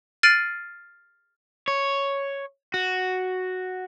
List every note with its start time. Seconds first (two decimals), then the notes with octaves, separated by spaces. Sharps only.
0.23 F6 A6 C7 D7 D#7 F#7
1.68 C#5
2.74 F#4